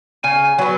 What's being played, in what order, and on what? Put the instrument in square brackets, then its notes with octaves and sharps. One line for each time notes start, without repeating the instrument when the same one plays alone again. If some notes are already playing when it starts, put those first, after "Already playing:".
[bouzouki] C#3 [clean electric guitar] G#5
[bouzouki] F#3 B3